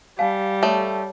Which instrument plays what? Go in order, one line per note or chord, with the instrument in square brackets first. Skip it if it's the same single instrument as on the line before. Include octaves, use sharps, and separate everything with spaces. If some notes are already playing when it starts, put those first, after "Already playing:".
[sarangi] G3 [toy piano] F5 G#5 A5
[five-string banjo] A3 [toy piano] A4 C#5 A5